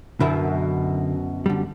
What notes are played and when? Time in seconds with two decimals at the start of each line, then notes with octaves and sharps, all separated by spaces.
0.20 F#2 B2 D3 E4
1.46 D3 G3